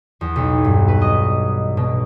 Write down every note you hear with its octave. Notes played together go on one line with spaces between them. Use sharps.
E2
B1
G2
B4
D#5
B2